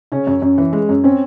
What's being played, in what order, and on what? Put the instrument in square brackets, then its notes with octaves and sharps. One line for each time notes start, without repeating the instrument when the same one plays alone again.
[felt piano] C#3 [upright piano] C#4
[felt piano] F#2
F#2
E3
G#3
F#2
[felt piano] C4 [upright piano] C#4